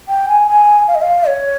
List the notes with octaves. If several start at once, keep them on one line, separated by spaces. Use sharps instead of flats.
G5
G#5
G#5
F5
D#5
F5
C#5